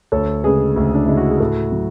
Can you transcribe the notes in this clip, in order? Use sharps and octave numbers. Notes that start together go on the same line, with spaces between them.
D2 A4 C#5
C#3 G#3 G#4 B4
D2
D4
C#3 G#3 E4
F#4
G#4
A2 F#4 A4
F#3